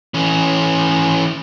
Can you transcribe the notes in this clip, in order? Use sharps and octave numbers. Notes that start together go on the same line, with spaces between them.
E3 C#4